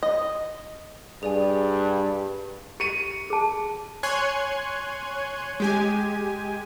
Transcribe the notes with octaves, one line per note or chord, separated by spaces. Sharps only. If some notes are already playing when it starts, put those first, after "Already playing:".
D#5
G2 G#4 D5 G#5
G4 C#7 D#7
G#4 A5
C#5 G#5 C6 F#6 G#6
G#3 G4 G#5